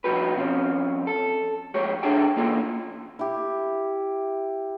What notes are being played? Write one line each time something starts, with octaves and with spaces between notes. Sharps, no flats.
B2 F3 F#4 G4 B4
F3 C4 C#4
A4
F2 G#3 G4 C#5
C#2 D4 G#4 A4 G5
E3 A#3 F4 A4
E4 G4